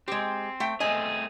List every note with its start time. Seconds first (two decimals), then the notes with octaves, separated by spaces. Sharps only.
0.08 G#3 C4 G4
0.60 A3 G5
0.80 A3 C4 G#4 D#5 G#5